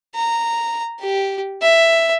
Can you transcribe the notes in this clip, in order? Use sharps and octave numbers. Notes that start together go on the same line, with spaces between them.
A#5
G4
E5